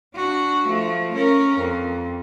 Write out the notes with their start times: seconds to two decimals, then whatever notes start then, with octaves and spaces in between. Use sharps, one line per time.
0.15 D4 F#4
0.67 F3 A3
1.14 C#4 A#4
1.58 F2